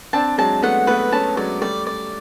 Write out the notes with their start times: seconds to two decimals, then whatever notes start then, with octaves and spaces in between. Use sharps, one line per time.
0.13 C4 D4 A5
0.38 F#3 G#3 A5
0.62 A3 B3 F#5
0.87 A3 B3 B4
1.12 B3 C#4 A5
1.37 F#3 G#3 D5
1.61 G3 A3 D5
1.87 D5